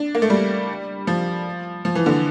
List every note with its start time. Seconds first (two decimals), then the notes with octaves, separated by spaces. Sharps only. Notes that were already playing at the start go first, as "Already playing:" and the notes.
Already playing: D4
0.15 A#3
0.22 A3
0.30 G3
1.07 F3
1.85 F3
1.95 E3
2.06 D3